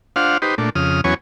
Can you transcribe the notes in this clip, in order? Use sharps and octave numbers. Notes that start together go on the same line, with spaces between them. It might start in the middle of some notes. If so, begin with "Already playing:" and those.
D4 F4 C5 F5 F#5
D#4 G4 B4 C5
A#2 A3 D4
F2 C#3 D#6 F6
E2 F#3 B3 C#4 C#5 G#5